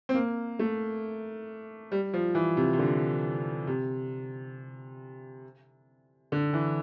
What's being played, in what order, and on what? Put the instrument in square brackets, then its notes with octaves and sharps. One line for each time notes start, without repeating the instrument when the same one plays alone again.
[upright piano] C4
A#3
A3
G3
F3
E3
C3
C3
D3
C3
D3
E3